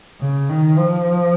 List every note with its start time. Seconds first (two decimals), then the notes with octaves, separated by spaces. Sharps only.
0.21 C#3
0.49 D#3
0.78 F3